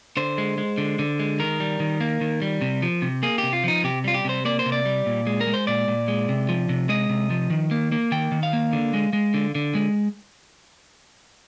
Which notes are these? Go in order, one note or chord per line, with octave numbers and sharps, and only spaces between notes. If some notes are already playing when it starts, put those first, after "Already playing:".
D3 C5
G#3
G#3
D3
D3
G#3
D#3 A#4
G3
D#3
A#3
D#3
G3
C3
F3
C3
A#3 G#4
G4
C3
F4
F3 D#4
C3 G4
G3 F4
G4
C3 C5
A#3 D5
C5
C3
D5
G3
A#2
G#3
A#4
G#3
C5
A#2 D5
A#2
G#3
C3
F3
C3
G#3 D#5
C3
F3
D#3
A#3
A#3
D#3 G5
D#3
F5
A#3
D3
G#3
G#3
D3
D3
G#3